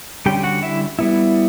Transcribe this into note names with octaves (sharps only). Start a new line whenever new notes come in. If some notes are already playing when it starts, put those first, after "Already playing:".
D3 G3 C#4 G4 G5
F#4 F#5
E4 E5
G3 B3 E4